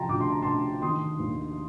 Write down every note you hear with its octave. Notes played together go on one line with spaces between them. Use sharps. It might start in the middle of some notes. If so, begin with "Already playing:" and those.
Already playing: C3 F3 G5 A5 A#5 C6
D2 D6
C6
A#5
D2 A5 C6
D#3 C6 D#6
D#2